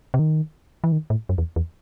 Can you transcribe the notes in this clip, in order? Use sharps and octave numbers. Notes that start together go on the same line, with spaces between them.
C3
D#3
E3
D#3
A2
F#2
E2
E2